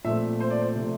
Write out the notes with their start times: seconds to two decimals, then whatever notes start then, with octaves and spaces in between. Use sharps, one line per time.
0.05 A#2 F3 A3 C4 E5
0.40 C5
0.50 D5
0.61 C5
0.75 C3 F3 A3